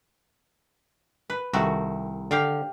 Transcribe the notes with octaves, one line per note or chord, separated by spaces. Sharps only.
B4
C2 D#3 A3 F#4
D3 G4 F5 G5